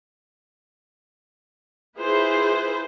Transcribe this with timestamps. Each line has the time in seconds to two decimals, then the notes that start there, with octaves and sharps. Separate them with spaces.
1.97 E4 F4 G#4 B4 C5